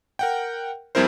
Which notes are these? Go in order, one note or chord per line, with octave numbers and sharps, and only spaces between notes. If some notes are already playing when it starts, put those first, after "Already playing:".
A#4 F#5 G5
F2 G3 C4 E4 A#4 C5